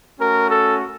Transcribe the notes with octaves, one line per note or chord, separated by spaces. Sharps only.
A3 C#4 F#4 A#4
A4